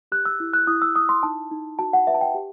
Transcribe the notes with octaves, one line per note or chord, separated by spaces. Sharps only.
G4 F#6
E6
E4
F#6
E4 D#6
E6
E4 D#6
C6
D#4 A5
D#4
F#4 A5
F#5
B4 E5
A5
G5
G4